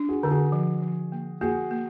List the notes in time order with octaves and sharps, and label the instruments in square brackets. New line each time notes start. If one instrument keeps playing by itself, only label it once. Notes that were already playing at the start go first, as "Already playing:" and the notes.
Already playing: [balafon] D4
[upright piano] F#4 G#4
[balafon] D3 [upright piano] A4
[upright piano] F#4 G#4
[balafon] F3
F3
A#3
[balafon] A#3 [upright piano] F#4 G#4
[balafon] A#3